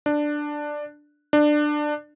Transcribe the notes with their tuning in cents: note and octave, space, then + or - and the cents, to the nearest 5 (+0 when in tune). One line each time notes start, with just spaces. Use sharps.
D4 +10
D4 +20